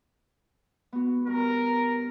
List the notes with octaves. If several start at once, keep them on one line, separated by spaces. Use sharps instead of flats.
B3 F#4
G2 A#4